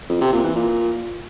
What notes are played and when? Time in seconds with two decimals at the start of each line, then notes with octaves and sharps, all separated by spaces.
0.10 F2
0.21 C3
0.33 A#2
0.44 E3
0.56 A#2